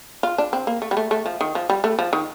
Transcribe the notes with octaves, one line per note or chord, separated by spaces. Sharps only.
F4
D4
C4
A#3
A3
G3
A3
A3
F3
D#3
F3
G3
A3
F3
D#3